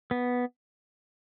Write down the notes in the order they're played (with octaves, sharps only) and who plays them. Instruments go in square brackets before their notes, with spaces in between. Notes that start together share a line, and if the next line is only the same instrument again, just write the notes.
[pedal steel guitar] B3